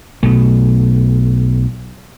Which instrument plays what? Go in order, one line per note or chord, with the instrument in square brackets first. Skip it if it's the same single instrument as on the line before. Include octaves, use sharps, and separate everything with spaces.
[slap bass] B1 B2 A3